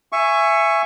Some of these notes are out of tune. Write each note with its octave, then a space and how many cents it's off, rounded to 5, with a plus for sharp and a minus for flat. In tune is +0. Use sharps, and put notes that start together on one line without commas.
E5 +20 G#5 +0 C#6 +0